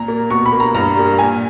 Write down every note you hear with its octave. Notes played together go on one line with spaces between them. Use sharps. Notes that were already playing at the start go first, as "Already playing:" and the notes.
Already playing: A#2 A#5
A#3
B2 C#6
B5
A#3
A#5
G2 A#5
G3 A#3
A#2 G#5